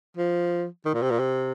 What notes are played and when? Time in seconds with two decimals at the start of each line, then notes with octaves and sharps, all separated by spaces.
0.17 F3
0.85 D#3
0.94 A#2
1.02 C3
1.11 A#2
1.19 C3